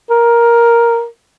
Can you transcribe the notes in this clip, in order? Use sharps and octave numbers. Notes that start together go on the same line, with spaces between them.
A#4